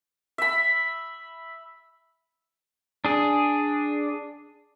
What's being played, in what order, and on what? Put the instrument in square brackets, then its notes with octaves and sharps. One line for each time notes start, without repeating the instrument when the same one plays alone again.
[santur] E5 B5
[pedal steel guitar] D4 G#4